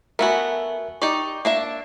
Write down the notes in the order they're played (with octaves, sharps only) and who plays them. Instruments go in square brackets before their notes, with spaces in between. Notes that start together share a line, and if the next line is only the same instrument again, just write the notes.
[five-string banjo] A3 B3 F#4 [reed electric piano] A#4 E5 G#5
[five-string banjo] D#4 G4 D5 [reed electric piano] C#6
[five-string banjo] A#3 D4 E5